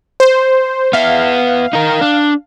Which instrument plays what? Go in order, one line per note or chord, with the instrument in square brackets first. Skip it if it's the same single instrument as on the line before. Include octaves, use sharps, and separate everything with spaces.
[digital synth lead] C5
[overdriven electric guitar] B3 E5 [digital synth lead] F5
[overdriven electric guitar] D#4 A#4
D4